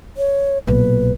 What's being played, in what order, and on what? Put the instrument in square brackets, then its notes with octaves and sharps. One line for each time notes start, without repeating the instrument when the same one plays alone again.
[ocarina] C#5
[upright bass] B1 A#2 [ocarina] B4